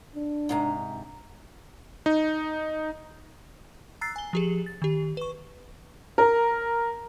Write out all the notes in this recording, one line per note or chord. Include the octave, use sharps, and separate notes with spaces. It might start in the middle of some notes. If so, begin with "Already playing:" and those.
D4
G#2 C3 A#5
D#4
A#5 E6 F#6 A6 C7
G#5 G7
F3 G4 G#4
A6
D#3 G4
B4 C#6
A#4